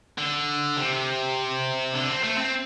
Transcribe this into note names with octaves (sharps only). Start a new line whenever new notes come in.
D3
C3
D3
C4
A3
C4